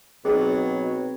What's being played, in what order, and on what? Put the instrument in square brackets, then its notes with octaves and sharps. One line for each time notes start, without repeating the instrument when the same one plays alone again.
[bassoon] B2 [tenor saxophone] F#3 [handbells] C4 D#4 C#5 [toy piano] G#4